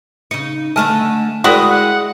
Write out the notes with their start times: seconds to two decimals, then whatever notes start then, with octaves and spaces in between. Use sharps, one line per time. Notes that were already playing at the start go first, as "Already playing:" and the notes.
0.31 C#3 D#4 C#7
0.76 D3 A3 D#5 G#5 A5 F6
1.44 G#3 E4 F#4 A#4 D5 G5 D#6
1.69 F#5